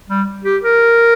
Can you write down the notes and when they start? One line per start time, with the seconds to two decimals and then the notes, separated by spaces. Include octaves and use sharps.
0.10 G3
0.45 G4
0.63 A#4